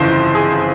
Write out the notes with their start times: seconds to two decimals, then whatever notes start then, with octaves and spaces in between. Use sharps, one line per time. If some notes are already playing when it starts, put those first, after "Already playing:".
Already playing: G1 F2 C#3 E3 C5
0.35 G#4